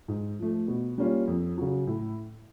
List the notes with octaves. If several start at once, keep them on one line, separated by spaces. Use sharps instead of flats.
G#2
F3 A3
B2
G3 A#3 C#4 F4
F2
C#3 F#3
A2